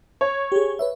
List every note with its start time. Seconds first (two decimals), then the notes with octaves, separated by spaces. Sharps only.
0.21 C#5
0.52 G4 G#4
0.79 B4 C#5 E5